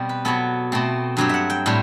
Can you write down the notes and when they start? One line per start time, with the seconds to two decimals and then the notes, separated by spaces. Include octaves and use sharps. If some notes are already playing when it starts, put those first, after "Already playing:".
Already playing: B2 G3 C4
0.09 B4
0.25 B2 F#3 B3 A4
0.72 B2 A3 C4
1.17 G2 F#3 C4 G4
1.29 E5 F#5
1.50 G5
1.66 A2 G3 C4